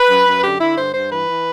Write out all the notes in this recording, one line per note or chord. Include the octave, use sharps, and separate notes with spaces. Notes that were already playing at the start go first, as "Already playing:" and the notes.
Already playing: B4
F#2
F#2
D3 G4
D3 E4
G2 C5
G2 C5
E3 B4
E3